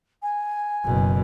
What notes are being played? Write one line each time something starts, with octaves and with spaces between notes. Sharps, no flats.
G#5
F#1 B2